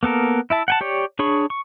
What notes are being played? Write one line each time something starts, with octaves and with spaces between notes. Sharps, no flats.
A#3 B3 A4 A#4
E4 E5 A5
F#5 G5 A5
G4 C#5 D5
D4 G#4 C#5 B5 C#6
C#6